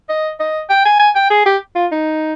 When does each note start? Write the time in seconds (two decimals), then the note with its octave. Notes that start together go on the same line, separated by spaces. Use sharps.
0.09 D#5
0.40 D#5
0.70 G5
0.85 G#5
1.00 G#5
1.16 G5
1.30 G#4
1.46 G4
1.75 F4
1.92 D#4